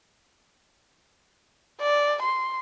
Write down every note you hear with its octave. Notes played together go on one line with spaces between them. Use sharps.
D5
C6